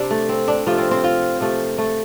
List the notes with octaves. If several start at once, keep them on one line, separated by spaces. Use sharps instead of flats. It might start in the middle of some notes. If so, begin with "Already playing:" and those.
Already playing: C3 D4
A3
C4
D4
C3 F3 A3 F4
C4
C4
F4
C3 F3 A3
A3